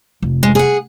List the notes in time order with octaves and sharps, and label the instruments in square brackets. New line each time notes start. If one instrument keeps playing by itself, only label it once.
[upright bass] F1
[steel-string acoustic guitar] G#3
G#4 F#5